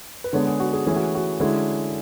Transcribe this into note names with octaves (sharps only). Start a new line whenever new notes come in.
B4
D3 G#3 B3 D4 C#5
G#4
F#4
G#4
E3 A3 C#4 E4 G#4
F#4
F#4
D3 G#3 C#4 E4